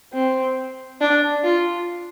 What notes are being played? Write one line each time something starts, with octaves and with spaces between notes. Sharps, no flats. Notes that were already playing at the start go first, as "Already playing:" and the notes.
C4
D4
F4